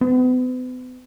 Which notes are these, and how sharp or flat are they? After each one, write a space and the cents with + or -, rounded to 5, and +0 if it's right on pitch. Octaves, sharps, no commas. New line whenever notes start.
B3 +40